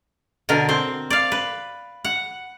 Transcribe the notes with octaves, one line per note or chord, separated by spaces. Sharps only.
B2 D3 A#4
C4 C5
D5 F5
B4
F#5